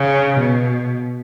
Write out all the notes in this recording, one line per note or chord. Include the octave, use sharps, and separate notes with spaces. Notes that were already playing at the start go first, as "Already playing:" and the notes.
Already playing: C#3
B2